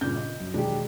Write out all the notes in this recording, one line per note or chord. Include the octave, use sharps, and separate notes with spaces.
G2 A#2 C#3 G6
D#5
F#2
E1 D#3 G#3 D4 G4